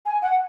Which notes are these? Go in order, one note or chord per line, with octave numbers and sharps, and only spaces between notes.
G#5
F#5